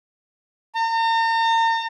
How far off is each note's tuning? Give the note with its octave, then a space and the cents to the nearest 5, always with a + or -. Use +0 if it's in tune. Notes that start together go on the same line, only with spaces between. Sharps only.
A#5 -40